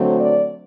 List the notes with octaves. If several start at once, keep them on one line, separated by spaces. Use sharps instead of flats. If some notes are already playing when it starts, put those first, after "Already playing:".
Already playing: D3 F#3 A3 C4
D5